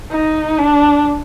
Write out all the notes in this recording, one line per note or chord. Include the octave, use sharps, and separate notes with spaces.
D#4
D4